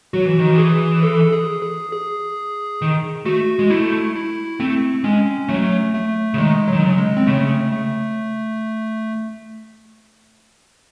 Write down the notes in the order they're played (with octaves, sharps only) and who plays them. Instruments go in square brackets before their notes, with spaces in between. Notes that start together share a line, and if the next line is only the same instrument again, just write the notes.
[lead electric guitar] F#3 [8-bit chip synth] F#4
[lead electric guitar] E3
D#3
E3
[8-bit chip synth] G#4
A4
G#4
G#4
G#4
[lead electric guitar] D#3
[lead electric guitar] A3 [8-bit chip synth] F#4
[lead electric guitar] G#3
[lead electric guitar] A3 [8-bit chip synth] E4
[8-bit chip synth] E4
[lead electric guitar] A3 [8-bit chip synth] C4
[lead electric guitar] G#3 [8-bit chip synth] C#4
[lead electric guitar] F#3 [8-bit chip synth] A3
[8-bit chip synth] A3
[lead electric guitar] C#3
[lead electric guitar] D#3 [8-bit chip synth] G#3
[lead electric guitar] D#3 [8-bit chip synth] F#3
[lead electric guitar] C#3
[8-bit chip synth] G#3
C4
[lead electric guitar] C#3 [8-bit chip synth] A3
[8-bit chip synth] A3